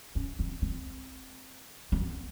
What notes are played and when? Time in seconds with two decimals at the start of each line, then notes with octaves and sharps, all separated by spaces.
0.15 C#4
0.39 C4
0.62 C4
1.92 C4
2.01 B3